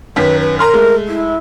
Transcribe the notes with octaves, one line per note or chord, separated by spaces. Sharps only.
F#2 D#3 B4 B6
B4
A#4 A#5 C6 F6
G#3 A3
E4